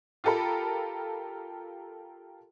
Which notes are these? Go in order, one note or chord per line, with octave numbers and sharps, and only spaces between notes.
F4 G4 A4 A#4 B5